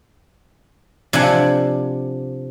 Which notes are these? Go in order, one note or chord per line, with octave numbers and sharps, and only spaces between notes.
C3 F3 D4 F#5 G#5